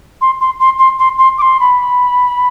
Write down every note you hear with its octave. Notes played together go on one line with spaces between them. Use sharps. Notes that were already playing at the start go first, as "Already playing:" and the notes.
C6
C6
C6
C6
C6
C6
D6
C6
B5